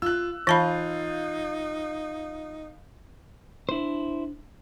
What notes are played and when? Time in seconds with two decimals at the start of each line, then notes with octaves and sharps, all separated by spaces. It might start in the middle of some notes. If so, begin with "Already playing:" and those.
0.02 F4 E6 F#6
0.47 E3 D#4 F4 F5 A5 B5 G6 A6
3.69 D4 E4 C5